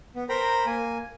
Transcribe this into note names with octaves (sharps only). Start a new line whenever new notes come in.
B3
A#4 C5 G5 A#5 B5
A#3 G#5